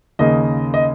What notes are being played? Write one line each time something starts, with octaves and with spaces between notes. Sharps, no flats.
D#2 C#3 A#3 D#5
D#5